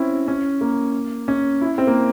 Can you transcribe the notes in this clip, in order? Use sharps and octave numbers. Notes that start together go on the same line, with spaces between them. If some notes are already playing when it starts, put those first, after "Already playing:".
Already playing: C4 C#4 E4
C#4
A#3
C#4
E4
C4
A#3